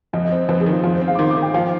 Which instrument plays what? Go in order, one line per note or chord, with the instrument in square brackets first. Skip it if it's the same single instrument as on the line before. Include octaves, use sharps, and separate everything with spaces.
[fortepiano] F2 [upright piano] D#5
[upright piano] D#5
[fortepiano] C4
[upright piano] C5
[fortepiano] F2 [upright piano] B4
[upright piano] G#4
[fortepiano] D#3
[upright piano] F4
[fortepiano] F2 [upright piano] F4
[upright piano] C5
[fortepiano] C4
[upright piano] F5
D6
[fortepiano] D#3 [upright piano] C6
[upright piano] D6
[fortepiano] D#3
[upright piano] G5
[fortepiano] F3 [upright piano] F5